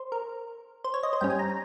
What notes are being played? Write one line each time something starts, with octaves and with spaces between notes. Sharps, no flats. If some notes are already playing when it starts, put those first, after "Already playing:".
Already playing: C5
A#4
C5
C#5
D#5
C5
G2 G3 C#4 G5
G#5
A#5
A#5